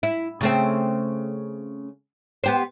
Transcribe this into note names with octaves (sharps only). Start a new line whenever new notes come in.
E4
C#3 A3 C4
B3 G4 C5